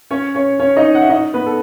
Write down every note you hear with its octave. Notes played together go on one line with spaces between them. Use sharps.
C#4 C#5
C#4 C#5
C#4 C#5
D#4 D#5
F#5
E5
D#4 D#5
B3 B4
A4